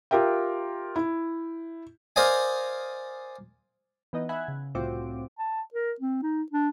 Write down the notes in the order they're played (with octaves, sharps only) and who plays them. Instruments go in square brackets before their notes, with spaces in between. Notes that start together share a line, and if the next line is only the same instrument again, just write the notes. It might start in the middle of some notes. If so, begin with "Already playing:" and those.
[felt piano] F4 G4 A#4 E5 G5
E4
[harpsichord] A#4 C5 D5 D#5 F5 G#5
[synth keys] E3 B3 D#4 D#5
E5 F#5 G#5 B5 F#6 G#6
C#3
C2 A2 C4 F4 F#4 D6
[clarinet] A5
A#4
C4
D#4
D4